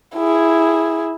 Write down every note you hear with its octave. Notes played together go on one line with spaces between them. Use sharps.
E4 G#4